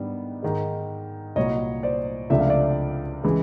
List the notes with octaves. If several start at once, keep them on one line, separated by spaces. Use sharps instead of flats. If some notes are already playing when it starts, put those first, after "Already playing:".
Already playing: G#2 D#3 G3 B3 D4
G#2 D#3 G#3
C2 A#2 F#3 C#5 D#5
C5 D5
C#2 C3 F3 A3 D4 E5
F5
D5 E5
C#3 E3 G#3